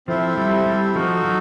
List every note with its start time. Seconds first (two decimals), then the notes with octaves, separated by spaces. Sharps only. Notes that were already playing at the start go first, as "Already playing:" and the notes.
0.08 F3 C4 E4 A4 C5 E5
0.37 G3
0.66 G3
0.95 F3 D#4 F#4 A4
1.25 F#3